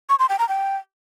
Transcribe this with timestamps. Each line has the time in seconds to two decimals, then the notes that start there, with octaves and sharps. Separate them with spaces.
0.09 C#6
0.19 C6
0.29 G5
0.39 A#5
0.49 G5